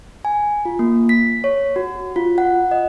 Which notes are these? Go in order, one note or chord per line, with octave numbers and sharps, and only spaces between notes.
G#5
F4
A#3
B6
C#5
F#4
F4
F#5
D#5